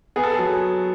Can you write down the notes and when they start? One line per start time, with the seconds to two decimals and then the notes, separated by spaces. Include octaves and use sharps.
0.16 B3 G#4
0.23 A4
0.32 G#4
0.39 F#3